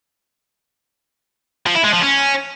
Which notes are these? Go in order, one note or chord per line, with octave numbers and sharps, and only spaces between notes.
F3
E4
G#3
F3
C#4